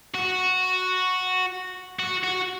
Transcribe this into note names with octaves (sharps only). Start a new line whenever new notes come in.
F#4
F#4
F#4